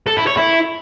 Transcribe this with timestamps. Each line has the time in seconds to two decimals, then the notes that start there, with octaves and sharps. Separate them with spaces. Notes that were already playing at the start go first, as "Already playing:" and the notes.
0.07 A4
0.17 E4
0.27 C#5
0.37 E4